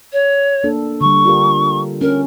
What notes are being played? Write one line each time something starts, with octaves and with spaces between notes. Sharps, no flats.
C#5
A#3 D4 A4
D3 G3 C#6
F4 G4 A#4
C#4 A#4